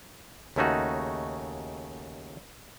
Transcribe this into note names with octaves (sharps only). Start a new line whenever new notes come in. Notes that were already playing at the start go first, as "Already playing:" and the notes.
D#2 C#3 A3 C#4 D#4 F#4